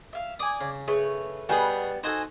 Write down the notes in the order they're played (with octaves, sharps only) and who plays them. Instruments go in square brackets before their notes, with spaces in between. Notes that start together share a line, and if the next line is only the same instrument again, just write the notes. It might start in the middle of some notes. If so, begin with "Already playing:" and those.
[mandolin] E5 F5
[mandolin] D5 G#5 [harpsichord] D#6
[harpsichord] C#3
[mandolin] A3 B4 C#5 [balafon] G#4
[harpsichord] B2 G#4 [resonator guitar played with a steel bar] G3 B3 [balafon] G#5
[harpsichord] D#4 F#4 A4 [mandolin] C5 G#5